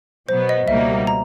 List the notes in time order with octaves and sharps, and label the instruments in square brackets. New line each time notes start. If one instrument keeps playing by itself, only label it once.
[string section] B2 F#3 B3 [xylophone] C5
[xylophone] D#5
[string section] C#2 B2 G3 A#3 D#4 [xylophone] E5
[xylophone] A#5